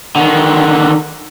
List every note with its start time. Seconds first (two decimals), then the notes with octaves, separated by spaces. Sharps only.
0.16 D3 D#3